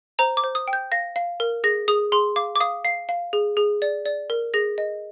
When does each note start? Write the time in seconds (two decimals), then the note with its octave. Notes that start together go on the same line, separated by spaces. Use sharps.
0.19 C5 A#5
0.37 D6
0.44 C5
0.55 D#6
0.68 G5
0.73 G6
0.92 F5 A#6
1.16 F5
1.40 A#4
1.64 G#4 A#6
1.88 G#4 D#6
2.12 G#4 C6
2.36 F5 D6
2.56 D6
2.60 F5 D#6
2.84 F5 C7
3.09 F5
3.33 G#4
3.57 G#4
3.82 D5
4.06 D5
4.30 A#4
4.54 G#4 A#6
4.78 D#5